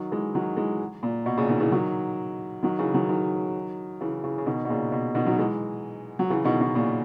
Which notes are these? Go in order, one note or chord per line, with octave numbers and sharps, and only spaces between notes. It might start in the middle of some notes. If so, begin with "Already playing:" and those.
Already playing: D#3 F#3
E3 G#3
D#3 F#3
E3 G#3
A#2
B2
A#2 C#3
B2 D#3
C#3 E3
D#3 F#3
D#3 F#3
C#3 E3
D#3 F#3
D#3 F#3
C#3 E3
C#3 E3
C#3
B2 D#3
B2
A#2 C#3
B2
B2 D#3
D#3 F#3
E3 G#3
F#3
C#3 E3
B2 D#3
B2 D#3
A#2 C#3